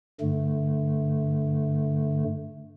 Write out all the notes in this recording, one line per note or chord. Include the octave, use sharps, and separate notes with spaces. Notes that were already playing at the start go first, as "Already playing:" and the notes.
G2 D3 A3